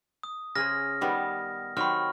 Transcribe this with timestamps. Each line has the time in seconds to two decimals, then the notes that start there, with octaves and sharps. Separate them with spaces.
0.23 D#6
0.55 C#3 G#4 C5 F6 A#6
1.01 D#3 G3 B3
1.77 D#3 F#3 C4 B5 C#6 F6